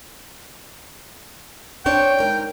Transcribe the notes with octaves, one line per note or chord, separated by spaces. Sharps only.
C4 D4 C#5 G5
G#2 A#4